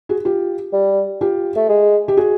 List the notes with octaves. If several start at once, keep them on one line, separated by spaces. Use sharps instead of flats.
F#4 G#4
F4 G4
G3
F4 G4
A3
G#3
G4
F#4 G#4